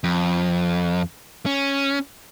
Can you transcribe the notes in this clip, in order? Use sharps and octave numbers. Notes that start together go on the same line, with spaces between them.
F2
C#4